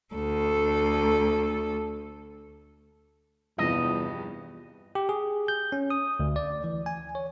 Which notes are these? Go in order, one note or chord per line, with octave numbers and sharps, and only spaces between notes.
D2 A4
E2 G2 C3 F3 D#5
G4
G#4
G6
C#4
D#6
D2
D5
E3
G#5
C#5